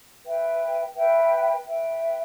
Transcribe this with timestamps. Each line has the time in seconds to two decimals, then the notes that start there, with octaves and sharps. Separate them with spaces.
0.25 B4 E5 G5
0.96 B4 E5 G5
1.66 B4 E5 G5